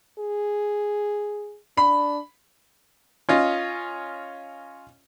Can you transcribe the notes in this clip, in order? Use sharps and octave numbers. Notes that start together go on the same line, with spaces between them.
G#4
D4 B5
C#4 F4 D#5